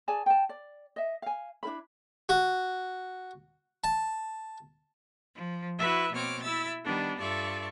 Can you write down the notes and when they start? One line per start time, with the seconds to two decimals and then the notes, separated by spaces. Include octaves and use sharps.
0.08 G#4 D5 G#5 A5
0.26 G5 A5
0.49 D5
0.96 D#5 E5
1.22 F5 G#5
1.63 D4 E4 A#4 B5
2.29 F#4
3.84 A5
5.35 F3
5.78 E4 F#4 B4 E5
6.11 B2 A#3 C4 C#5 D6 F6
6.42 E4 E5 E6 A6
6.84 D#3 G3 B3 D4
7.19 G2 F4 A4 D5 E5 C#6